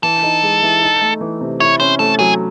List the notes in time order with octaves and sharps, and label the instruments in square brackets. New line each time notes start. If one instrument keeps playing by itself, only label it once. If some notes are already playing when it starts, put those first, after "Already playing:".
[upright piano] E3 [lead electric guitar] A4
[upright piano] D#4
G#3
E3
D#4
A3
E3
C3
[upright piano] E4 [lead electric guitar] C#5
[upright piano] C#4 [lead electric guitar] C5
[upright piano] A3 [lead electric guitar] A4
[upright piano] F#3 [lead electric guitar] G#4